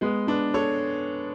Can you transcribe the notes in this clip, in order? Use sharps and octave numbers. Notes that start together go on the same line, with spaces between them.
G#3 B3
B3 D4
A4 C#5